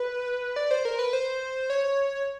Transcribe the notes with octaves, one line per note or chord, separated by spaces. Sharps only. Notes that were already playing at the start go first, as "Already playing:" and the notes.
Already playing: B4
D5
C5
A#4
B4
C5
C#5